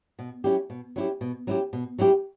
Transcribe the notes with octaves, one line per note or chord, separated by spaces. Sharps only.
B2
F#3 C#4 E4 G4
B2
F#3 C#4 E4 G4
B2
F#3 C#4 E4 G4
B2
F#3 C#4 E4 G4